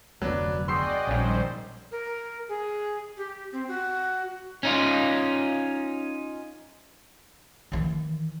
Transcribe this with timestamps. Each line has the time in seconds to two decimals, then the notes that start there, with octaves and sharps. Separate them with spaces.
0.22 F1 D2 F#3 B3 D4 B4
0.68 F#4 G#4 D5 D#5 G5 C6 E6 C7
1.07 E1 A#1 D#3 G3 C#4 C5
1.92 A#4
2.49 G#4
3.17 G4
3.52 C4
3.68 F#4
4.63 C#4 D#4 F4
7.72 D#3 E3